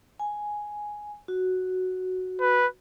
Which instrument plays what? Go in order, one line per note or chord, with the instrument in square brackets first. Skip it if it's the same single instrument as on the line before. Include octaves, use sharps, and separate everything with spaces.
[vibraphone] G#5
F#4
[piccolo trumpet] B4